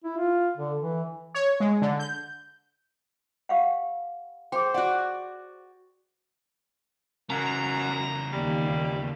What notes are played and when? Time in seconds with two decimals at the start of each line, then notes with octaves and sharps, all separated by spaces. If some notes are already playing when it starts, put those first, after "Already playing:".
0.04 E4
0.17 F4
0.57 D3
0.80 E3
1.35 C#5
1.60 G#3
1.82 D3
1.99 G6
3.49 G4 F5 F#5
4.52 G#4 C5 G5
4.74 F#4 D5 F#5
7.30 F#2 C#3 E3 A#5
8.32 D#2 G3